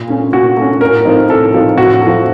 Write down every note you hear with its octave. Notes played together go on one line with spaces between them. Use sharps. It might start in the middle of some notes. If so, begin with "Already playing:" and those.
Already playing: A#2
A3 C#4
A#2 F#4
A3 C#4
A2 A#4
F3 A3 C4 D#4
A2 A4
F3 A3 C4 D#4
A2 F#4
A3
F3